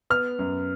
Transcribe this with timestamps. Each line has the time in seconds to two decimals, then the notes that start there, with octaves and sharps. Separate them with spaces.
0.10 B3 F6
0.39 F#2